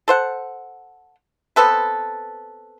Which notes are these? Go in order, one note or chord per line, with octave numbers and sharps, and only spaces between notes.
A4 C5 F#5
B3 C4 A4 B4